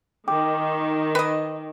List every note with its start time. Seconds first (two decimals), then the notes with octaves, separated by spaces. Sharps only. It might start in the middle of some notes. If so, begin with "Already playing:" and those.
0.28 D#3 G5 D6
1.15 B4 D#5